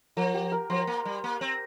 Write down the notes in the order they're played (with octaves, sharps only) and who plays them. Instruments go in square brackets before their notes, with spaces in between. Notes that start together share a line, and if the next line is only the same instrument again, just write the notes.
[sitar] F3 [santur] A#4
[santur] G4
A#4
[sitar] F3 [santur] C5
[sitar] A#3
G3
A#3
C4